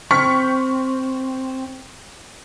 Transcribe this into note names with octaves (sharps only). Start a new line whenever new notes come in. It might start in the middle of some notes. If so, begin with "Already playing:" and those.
C4 C#6 F6 B6